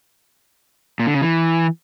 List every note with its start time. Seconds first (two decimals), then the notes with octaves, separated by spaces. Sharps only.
0.99 A#2
1.07 D3
1.14 C#3
1.22 E3